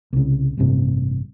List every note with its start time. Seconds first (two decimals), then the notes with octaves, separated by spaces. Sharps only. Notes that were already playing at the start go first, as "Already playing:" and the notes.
0.13 C2 C#3
0.57 A1 G2 C3